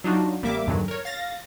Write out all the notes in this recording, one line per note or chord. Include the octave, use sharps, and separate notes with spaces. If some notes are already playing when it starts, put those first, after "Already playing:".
F#3 D4 D#4 F4 F#4
A1 G3 A#3 A#4 E5 D6
E2 G2 A#2 D3 D#3 F#3
A#4 C#5
F5 A6 A#6